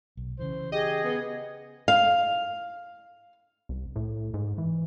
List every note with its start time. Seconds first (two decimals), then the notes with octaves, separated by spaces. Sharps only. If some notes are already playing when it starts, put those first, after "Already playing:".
0.17 B1
0.39 C#3 E3 C5
0.72 G4 G#4 D#5
1.04 B3
1.88 F5
3.69 C2
3.96 A2
4.34 G#2
4.58 E3